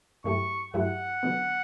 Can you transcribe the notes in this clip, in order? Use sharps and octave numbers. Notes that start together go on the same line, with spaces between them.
G2 F#3 A3 E4 G4 C#6
G2 F#3 A3 E4 G4 F#5
D3 F#3 B3